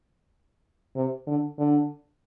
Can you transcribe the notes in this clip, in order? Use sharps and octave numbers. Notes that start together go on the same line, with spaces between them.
C3
D3
D3